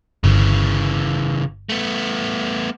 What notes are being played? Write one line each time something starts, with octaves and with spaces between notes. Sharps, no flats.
G1 C#3 E3
A3 B3